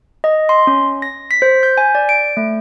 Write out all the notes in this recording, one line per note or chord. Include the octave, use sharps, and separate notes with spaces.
D#5
C6
C#4
A#6
B6
C5
G6
G#5
D5
D7
A3